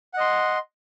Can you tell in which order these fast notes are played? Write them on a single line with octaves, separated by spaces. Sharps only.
F#5 D#5 C6